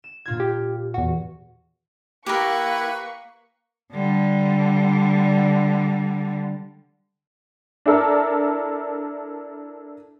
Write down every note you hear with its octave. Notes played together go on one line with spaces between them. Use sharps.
E7
A#2 F4 G#6
G4
E2 F#4
A#3 E4 G4 A#4 B4 C#6
D3 G3
D4 E4 A4 A#4